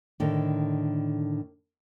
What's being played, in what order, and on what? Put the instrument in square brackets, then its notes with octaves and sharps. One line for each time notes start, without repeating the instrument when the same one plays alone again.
[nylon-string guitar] A2 D3 D#3